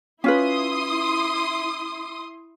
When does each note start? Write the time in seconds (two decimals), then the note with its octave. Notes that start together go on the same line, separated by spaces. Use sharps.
0.24 C#4 E4 F4 B4 C6 D#6